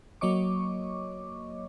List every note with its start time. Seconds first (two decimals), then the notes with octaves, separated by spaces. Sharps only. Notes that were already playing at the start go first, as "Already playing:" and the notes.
0.21 F#3 A#3 C#5 D#5 C#6 D6